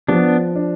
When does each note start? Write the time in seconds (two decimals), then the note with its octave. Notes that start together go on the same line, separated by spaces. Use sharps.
0.08 F3 B3 D4
0.56 D4